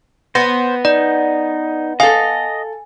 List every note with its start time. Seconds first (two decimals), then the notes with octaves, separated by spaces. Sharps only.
0.35 B3 C5 A#6
0.85 D#4 D5
2.00 A4 D#5 F5 G#5